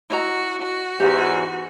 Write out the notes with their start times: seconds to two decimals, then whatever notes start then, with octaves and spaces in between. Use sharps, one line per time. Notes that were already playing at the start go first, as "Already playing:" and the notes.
0.10 E4 F#4 D#5 A#5
0.62 F#4
1.00 E2 G#2 G4